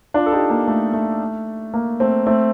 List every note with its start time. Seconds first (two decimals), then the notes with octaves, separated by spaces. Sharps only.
0.14 D4 F4
0.26 A4
0.32 D#4 G4
0.50 A#3
0.68 A3
0.94 A3
1.74 A#3
2.00 A3 C4
2.27 A3 C4